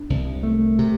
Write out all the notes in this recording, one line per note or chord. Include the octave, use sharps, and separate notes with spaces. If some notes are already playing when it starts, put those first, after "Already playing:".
Already playing: D4
C2
A3
C3